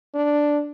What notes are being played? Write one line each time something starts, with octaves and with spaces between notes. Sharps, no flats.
D4